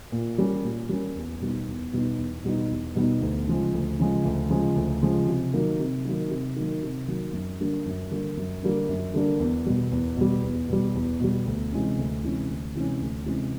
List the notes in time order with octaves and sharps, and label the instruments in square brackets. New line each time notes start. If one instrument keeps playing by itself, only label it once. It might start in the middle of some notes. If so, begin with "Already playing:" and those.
[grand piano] A#2
G3 A#3 C#4
A#2
G3 A#3 C#4
E2
B2 G3 B3 D#4
E2
B2 G3 B3 D#4
E2
B2 G3 B3 D#4
E2
B2 G3 B3 D#4
D2
C#3 F3 G#3
D2
C#3 F3 G#3
D2
C#3 F3 G#3
D2
C#3 F3 G#3
C3
D#3 F#3 A#3
C3
D#3 F#3 A#3
C3
D#3 F#3 A#3
C3
D#3 F#3 A#3
F#2
D3 G3 A#3 D4
F#2
D3 G3 A#3 D4
F#2
D3 G3 A#3 D4
F#2
D3 G3 A#3 D4
E2
B2 G3
E2
B2 G3
E2
B2 G3
E2
B2 G3
D2
C3 E3 G#3 C#4
D2
C3 E3 G#3 C#4
D2
C3 E3 G#3 C#4
D2
C3 E3 G#3 C#4